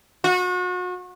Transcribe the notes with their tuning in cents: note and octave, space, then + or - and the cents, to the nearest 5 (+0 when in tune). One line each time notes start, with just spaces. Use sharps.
F#4 -35